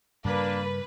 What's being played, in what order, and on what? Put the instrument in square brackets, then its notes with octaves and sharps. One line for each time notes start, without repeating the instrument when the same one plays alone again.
[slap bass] G2 C#3 G3 [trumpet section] A#3 D4 [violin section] B4